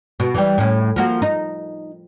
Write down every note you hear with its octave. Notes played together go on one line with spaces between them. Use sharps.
B2
E3 G3
A2 C#4
F3 A#3 F#4
D#4